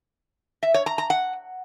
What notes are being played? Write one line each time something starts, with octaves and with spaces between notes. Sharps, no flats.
E5
C#5
A#5
A#5
F#5